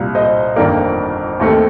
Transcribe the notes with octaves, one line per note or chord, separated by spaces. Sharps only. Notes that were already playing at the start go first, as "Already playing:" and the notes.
Already playing: C2 A#2 G3 A#3
C5 D#5
G1 F2 D#3 A#3 A#4 D5
D#2 D#3 A3 C4